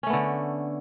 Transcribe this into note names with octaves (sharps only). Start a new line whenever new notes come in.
D3 A3 B3 C#4